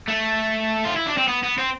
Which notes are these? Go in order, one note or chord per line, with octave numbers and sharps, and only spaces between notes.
A3
F4
E4
D4
C4
B3
B3
C4